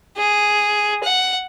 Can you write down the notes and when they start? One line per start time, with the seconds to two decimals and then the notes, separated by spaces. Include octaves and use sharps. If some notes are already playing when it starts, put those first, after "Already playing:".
0.17 G#4
1.03 F#5